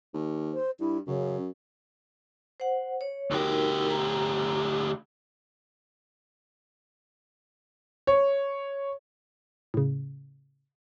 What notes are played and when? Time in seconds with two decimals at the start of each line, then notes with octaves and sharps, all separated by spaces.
0.14 D#2
0.54 C5
0.80 G2 E4
1.07 F#2 C#3
2.60 C5 F#5
3.01 C#5
3.31 D2 D#4 F#4 G4 A#4
3.90 A#5
8.07 C#5
9.74 A2 C#3